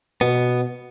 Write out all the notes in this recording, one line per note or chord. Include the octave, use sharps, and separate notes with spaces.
B2 B3